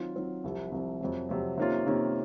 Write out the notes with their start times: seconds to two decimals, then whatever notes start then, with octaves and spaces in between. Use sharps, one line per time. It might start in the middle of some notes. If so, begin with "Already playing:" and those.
Already playing: D#3 F#3 C4 F4
0.15 D#3 F#3 C4 F4
0.44 C2 C3 F3
0.72 C2 C3 F3
1.01 F2 C3 F#3
1.29 F2 C3 F#3
1.58 C3 D#3 A#3 C#4 F4
1.86 C3 D#3 A#3 C#4 F4